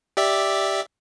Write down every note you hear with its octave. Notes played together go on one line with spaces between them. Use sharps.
G4 D5 E5